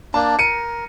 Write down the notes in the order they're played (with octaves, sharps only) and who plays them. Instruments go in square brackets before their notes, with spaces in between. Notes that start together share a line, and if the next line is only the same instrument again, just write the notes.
[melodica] A#3 D4 [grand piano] A5
[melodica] A#4 [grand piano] C#7 D#7